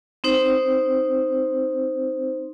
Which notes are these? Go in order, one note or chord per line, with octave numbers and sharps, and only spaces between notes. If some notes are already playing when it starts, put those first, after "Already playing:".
C4 D#4 C5